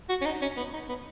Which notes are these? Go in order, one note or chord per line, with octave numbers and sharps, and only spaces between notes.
F#4
C#4
D#4
C#4
B3
D#4
B3